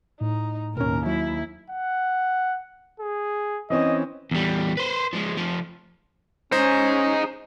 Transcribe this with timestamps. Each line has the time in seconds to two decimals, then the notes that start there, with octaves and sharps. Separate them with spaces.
0.21 A2 D#4
0.77 D#2 B2 C#4 A#4
1.06 F#3 E4
1.70 F#5
3.00 G#4
3.70 E3 C4 C#4 D#5
4.31 E2 G3
4.77 B4 C5
5.13 F3 G#3
5.38 F3 A3
6.52 C#4 D#4 G#4 C5